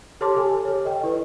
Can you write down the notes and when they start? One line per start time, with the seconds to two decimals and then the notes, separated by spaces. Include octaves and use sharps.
0.21 G4 A4 C#5 A5 C6 D6
0.36 G4 A4 G#5
0.65 A4 C#5
0.85 D#5 G5
1.03 E4 B4 D#5